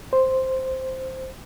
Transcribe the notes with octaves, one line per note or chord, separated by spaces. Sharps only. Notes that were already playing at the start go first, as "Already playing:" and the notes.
C5